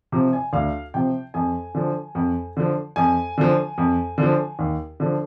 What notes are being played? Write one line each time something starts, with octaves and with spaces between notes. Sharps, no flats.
C3 F3
G#5
D2 F5
C3 F3 G5
F2 G#5
D3 F3
F2
D3 F3
F2 G#5
D3 F3
F2
D3 F3
D#2
D3 F3